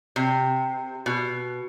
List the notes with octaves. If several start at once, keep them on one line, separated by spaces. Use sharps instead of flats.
C3
B2